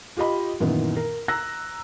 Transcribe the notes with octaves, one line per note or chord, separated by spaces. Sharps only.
F4 G4 D#5 B5
F#2 A#2 D#3 E3 B3
A#4
A#5 E6 F#6 A#6